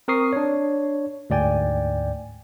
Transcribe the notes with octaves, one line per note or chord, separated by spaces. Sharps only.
C4 A#4 C#6 D#6 C7
D4 C#5
D2 G#2 D5 G5 G#5